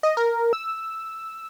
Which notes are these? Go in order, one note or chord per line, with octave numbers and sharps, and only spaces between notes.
D#5
A#4
E6